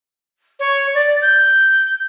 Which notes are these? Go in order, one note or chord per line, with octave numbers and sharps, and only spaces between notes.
C#5
D5
G6